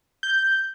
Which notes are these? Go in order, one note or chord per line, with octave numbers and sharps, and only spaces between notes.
G6